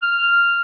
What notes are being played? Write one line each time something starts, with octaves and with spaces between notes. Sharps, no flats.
F6